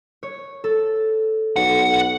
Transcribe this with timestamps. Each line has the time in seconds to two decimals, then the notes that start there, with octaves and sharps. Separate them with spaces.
0.23 C#5
0.64 A4
1.56 B1 F#5